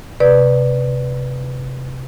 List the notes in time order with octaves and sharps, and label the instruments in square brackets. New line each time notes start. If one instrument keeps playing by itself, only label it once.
[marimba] C3 B4 D5